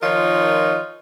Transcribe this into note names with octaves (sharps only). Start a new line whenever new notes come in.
D#3 F3 D#4 F4 A#4 C#5